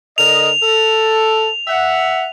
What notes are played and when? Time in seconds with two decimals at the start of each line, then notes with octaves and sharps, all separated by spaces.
0.18 D3 A#4 D#5 F7
0.62 A4
1.67 E5 F#5